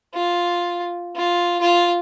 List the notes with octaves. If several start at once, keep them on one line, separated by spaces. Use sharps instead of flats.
F4
F4
F4